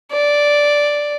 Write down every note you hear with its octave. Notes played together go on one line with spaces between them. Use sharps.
D5